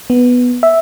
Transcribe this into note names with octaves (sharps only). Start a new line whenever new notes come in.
B3
E5